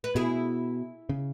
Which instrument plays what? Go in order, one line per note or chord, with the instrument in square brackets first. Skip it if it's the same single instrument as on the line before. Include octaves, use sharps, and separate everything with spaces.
[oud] B4
[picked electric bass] B2 [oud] E4 G#4
[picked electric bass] C#3